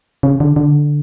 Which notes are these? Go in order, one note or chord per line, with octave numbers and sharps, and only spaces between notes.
C#3
D3
D3